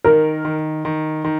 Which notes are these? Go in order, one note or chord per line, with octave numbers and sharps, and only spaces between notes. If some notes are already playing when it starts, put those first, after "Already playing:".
D#3 A#4
D#3
D#3
D#3